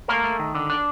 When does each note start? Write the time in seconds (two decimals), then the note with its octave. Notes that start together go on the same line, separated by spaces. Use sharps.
0.08 A3 A#3 A#4
0.24 A3
0.39 D#3
0.55 D3
0.70 D4